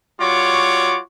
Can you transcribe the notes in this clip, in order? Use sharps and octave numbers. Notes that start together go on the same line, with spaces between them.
G3 F4 F#4 C#5 C#6 D6